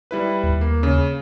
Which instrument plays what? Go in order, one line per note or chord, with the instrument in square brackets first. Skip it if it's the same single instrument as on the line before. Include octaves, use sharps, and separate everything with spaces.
[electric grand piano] G3 E4 B4
[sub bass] D#2
[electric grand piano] A#3
C#3